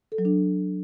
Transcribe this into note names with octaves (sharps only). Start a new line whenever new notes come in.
A4
F#3
D4